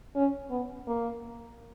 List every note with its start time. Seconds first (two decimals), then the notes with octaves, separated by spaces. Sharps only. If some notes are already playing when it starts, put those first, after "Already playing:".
0.15 C#4
0.50 B3
0.87 A#3